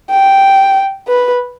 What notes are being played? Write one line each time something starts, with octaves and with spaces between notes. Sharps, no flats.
G5
B4